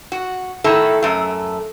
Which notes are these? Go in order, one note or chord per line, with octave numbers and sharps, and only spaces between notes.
F#4
D#3 A3 E4 A4
F#2 A3